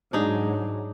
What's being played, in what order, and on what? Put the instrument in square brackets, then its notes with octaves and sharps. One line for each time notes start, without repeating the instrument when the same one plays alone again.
[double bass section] G#2 F#3 G#3 [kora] D4 D#4 G#4